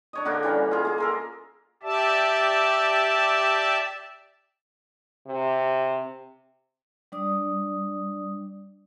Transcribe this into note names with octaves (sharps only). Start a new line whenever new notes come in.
D4 C#5 D#5
D3 A#3 D4 F#4
E3 G3 C#4
F4 G#4
A#3 G#4
A4 A#4 C6
G4 D5 E5 A5
C3
G3 D4 D5 D#6